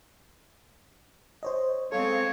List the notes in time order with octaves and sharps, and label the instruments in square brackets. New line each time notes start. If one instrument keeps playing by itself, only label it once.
[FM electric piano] C5 C#5 D#5
[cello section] G#3 C4 [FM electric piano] A4 [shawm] C#5 [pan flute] F5